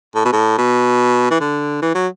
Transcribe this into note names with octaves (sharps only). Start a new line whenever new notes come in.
A2
B2
A2
B2
E3
D3
E3
F#3